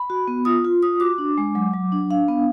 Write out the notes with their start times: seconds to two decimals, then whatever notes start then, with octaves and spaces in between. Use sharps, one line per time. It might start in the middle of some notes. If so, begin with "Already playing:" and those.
Already playing: B5
0.10 F#4
0.28 B3
0.45 F4 D#6
0.65 F4
0.82 F4 D#6
1.00 F#4 D6
1.18 D4
1.38 G#3
1.55 F#3
1.73 F#3
1.92 D4
2.10 D4 F5
2.28 B3